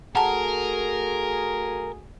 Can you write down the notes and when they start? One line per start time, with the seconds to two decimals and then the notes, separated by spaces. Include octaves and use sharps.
0.16 A3 F#4 G#4 A#4 F#5 A5